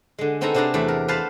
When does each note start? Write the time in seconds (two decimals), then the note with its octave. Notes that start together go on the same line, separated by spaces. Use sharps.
0.19 D3 G#3
0.41 B3 C4 D#4 A4 G#5 A#5
0.54 C3 C4 D4 G#4 A5 A#5
0.74 E2 A3 A4 D5
0.88 A#4
1.08 B4 C5 F5 F#5 A5